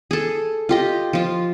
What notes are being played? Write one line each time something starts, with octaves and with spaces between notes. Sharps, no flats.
G#4 A4
F4 G4 D#5
F3 F4